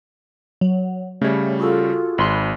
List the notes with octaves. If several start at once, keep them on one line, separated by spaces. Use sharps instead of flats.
F#3
C#3 G3 A3 C#5
F4 F#4 G#4 A4
G#1 B5 C6 F#6